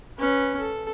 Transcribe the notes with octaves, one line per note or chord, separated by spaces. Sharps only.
C#4 B4
A4